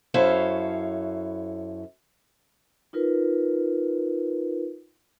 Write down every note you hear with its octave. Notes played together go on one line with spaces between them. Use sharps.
F#2 E4 A4 C5 C#5 F5
D#4 F4 A#4 B4